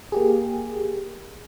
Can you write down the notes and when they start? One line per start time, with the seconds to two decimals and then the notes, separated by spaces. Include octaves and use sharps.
0.12 A#3 G4 G#4